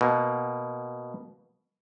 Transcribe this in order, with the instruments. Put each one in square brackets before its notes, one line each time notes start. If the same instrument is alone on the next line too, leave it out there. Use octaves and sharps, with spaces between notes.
[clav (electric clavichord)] B2 A#3